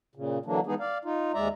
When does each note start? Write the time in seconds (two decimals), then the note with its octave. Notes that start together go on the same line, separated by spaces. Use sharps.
0.15 A#2 C#3
0.46 D3 E3 F#3 A#3 D4
0.66 E3 G#3 B3 D#4 G#4
0.80 D5 F5
1.05 D#4 F4
1.34 D#2 G#3 D5 E5 A#5